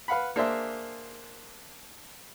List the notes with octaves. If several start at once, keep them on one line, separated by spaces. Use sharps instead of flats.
B4 F5 F#5 B5
A#3 D4 G#4 C5 E5